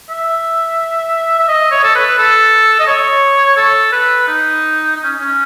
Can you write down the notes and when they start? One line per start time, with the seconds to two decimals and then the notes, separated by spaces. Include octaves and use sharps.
0.09 E5
1.39 E5
1.48 D#5
1.71 C#5
1.83 A4
1.95 B4
2.18 A4
2.80 D#5
2.87 C#5
3.57 A4
3.92 B4
4.27 D#4
4.96 D#4
5.04 C#4
5.19 C#4